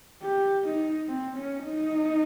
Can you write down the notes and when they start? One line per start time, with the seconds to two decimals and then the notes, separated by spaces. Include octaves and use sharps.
0.22 G4
0.65 D#4
1.08 C4
1.37 C#4
1.65 D#4